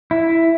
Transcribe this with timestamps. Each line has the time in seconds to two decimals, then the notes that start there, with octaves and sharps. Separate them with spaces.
0.11 E4